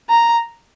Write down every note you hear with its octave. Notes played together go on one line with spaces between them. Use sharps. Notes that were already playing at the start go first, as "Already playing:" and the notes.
A#5